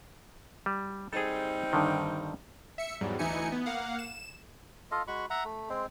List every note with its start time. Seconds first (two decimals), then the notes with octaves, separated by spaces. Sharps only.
0.66 G3
1.13 G3 C4 D#4 G#4 A4
1.73 G2 D3 D#3
2.78 E5 C#7
3.01 E2 G#2 F#3 G3
3.19 D2 E3 D#4 E4 G#5 C#7
3.52 B3
3.66 A#3 F5 F#5
3.99 E7
4.91 F4 A4 D#5 F5
5.07 G#3 F#4 B5 C#6
5.30 E5 F#5 A#5
5.45 A3
5.69 G#3 C4